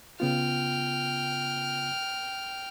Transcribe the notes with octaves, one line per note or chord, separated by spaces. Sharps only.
C#3 B3 F4 G5 F6